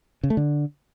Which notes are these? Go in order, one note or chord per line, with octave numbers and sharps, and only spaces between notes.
C#3
A3
D3